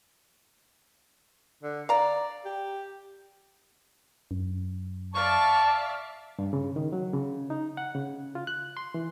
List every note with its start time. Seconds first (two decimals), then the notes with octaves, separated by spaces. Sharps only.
1.63 D3
1.89 D5 F5 A#5
2.45 G4
4.31 F#2
5.14 D5 E5 F5 A5 C#6
6.39 G2
6.53 C#3
6.76 D#3
6.93 F#3
7.14 C#3
7.50 D#4
7.77 F#5
7.95 C#3
8.35 F4
8.47 F#6
8.77 C6
8.94 E3